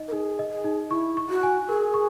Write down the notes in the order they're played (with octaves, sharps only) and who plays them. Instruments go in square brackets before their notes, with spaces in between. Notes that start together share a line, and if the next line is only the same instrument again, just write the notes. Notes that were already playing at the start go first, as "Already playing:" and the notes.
Already playing: [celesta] D#4 D#5
[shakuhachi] A#4
[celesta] D#4 [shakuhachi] G#4
[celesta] D#5
[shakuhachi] G#4
[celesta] D#4
[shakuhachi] E4 [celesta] C#6
[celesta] C#6
[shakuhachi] F#4
[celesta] G#5
[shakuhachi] G#4 [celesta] A#4
[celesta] C#6